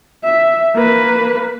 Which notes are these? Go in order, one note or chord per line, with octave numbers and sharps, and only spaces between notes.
E5
A#3 B4